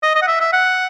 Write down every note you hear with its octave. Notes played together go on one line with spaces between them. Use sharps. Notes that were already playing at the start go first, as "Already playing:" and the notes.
D#5
D#5
F#5
E5
E5
F#5